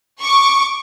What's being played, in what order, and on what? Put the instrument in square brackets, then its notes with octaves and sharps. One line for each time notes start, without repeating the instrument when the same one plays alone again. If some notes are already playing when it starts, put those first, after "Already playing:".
[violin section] C#6 D6